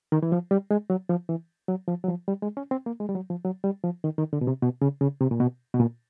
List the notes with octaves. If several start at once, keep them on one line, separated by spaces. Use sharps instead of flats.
D#3
E3
F3
G3
G#3
F#3
F3
E3
F#3
F3
F#3
F3
G3
G#3
C#4
C4
A#3
G#3
G3
F#3
F3
F#3
G3
F3
D#3
D#3
D3
B2
C3
B2
C#3
C#3
C3
A#2
B2
B2
A#2